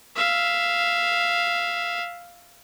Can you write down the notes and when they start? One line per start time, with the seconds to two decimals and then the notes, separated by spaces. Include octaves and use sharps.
0.16 E5 F5